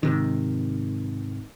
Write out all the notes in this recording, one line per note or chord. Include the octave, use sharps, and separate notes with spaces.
G#2 C3 D#3